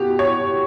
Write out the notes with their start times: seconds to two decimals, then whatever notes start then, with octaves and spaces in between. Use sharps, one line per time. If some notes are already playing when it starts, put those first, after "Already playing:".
Already playing: B2 G4
0.19 C#5